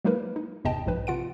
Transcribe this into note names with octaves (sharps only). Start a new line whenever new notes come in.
F#3 G#3 A#3 D#4 A#4 B4
D#4
G1 E2 C3 D#5 G5 A5
A#1 G#2 F3 B4
C3 F4 F#5 D7